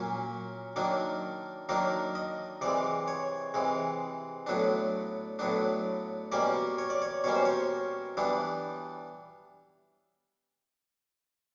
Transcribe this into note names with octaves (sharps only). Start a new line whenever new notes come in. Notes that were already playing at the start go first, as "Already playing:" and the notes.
Already playing: A#2 F#3 A#3 C#4
D#3 F#3 A#3 D4
D#3 F#3 A#3 D4 A#4
D#5
C3 E3 G#3 D5
C#5
C3 E3 G#3
A2 F#3 B3 D4
A2 F#3 B3 D4
B2 G3 A#3 C#4 D5
C#5
D5
C#5
B2 G3 A#3 C#4 C#5
C5
C#5
E3 G3 B3 D4